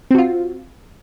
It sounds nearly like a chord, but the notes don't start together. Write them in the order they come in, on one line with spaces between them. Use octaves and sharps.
C4 F#4 F4